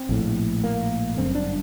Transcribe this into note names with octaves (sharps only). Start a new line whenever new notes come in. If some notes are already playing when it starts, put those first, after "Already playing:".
Already playing: C4
A#1 A2
A#3
G1 F#2 D3 C4
D4